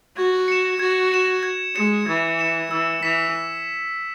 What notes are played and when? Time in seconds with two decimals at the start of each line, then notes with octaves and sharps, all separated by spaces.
0.17 F#4 G#6
0.48 C#7 E7
0.79 F#4 G#6
1.12 C#7 E7
1.43 G#6
1.75 G#3 C#7 E7
2.06 E3 G#6
2.39 C#7 E7
2.71 E3 E6
3.02 E3 B6 E7